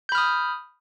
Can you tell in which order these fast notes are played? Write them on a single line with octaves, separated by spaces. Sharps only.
G6 B5 F6 D#6